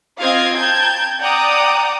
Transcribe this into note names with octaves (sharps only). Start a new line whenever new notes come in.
C4 F4 D#5 F5 D#6 G#6
G5 A5 A#5 G6 G#6
D5 F#5 G5 A#5 D6 D#6